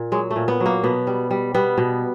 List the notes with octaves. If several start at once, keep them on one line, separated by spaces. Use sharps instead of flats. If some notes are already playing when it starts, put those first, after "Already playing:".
Already playing: A#2
F#3 G#3
A3
A#2
B3
F#3
A#3
B2 B3
G3
G3
G3 B3
B2